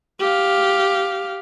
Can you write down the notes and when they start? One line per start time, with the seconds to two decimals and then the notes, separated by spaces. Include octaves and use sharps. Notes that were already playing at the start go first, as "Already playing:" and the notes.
0.20 G4 F5